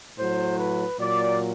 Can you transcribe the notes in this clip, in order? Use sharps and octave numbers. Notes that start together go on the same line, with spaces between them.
A2 F#3 C5
B4
A#2 F#3 D5